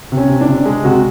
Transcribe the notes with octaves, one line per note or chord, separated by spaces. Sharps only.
C3
C#4
C3
D4
C3
G#3
C3 F#4